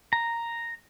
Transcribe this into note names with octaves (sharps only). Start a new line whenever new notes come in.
A#5